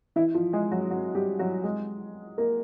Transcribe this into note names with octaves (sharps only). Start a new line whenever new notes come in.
E3 E4
F3 F4
G#3 G#4
F#3 F#4
F#3 F#4
G3 G4
F#3 F#4
G#3 G#4
A#3 A#4